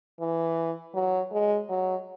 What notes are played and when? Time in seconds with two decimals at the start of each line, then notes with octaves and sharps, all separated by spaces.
0.20 E3
0.94 F#3
1.31 G#3
1.69 F#3